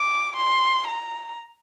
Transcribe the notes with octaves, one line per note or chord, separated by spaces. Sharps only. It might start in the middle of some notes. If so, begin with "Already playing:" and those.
Already playing: D6
C6
A#5